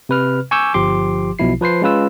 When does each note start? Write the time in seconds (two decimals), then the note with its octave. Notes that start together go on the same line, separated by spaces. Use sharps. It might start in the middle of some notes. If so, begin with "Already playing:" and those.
0.09 C3 B4 F6
0.51 G#5 C#6 D6 E6 G6
0.74 G1 F3 G4 C6 D6
1.39 B1 B2 F3 E4 C7
1.61 F3 B4 C5 C7
1.82 G#3 C#4 F4 B4 E6